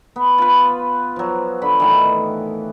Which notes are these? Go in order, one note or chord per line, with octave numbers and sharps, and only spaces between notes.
B3
F4 B4
F3 F#3
D3 B5
A2 D#3 E3